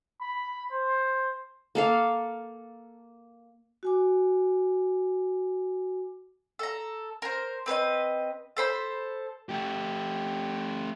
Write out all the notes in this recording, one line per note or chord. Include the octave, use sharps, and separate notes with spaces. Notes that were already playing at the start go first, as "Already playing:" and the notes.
B5
C5
A#3 A4 F5
F#4 G#5 D6
A4 A#5
A#4 C5
C4 B4 C5 D#5
A4 C5 B5
A3 G4